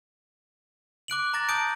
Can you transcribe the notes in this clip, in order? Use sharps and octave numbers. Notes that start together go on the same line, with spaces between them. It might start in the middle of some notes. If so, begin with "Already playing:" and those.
D6 F#6 D7 F#7
A#5 D6 A6 A#6
A5 D#6 G6 D7